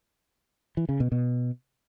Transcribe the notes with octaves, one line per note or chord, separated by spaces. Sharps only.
E3
C#3
B2
B2